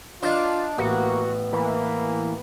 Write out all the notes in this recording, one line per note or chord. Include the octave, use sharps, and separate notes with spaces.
D4 D#4 F4 C5
A1 A#3 B3 F#4 G5
E3 A#3 B4